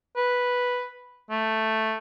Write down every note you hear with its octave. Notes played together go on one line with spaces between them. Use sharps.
B4
A3